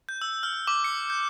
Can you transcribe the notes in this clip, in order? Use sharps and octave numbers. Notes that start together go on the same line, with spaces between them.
G6
E6
F6
D6
C#7
G6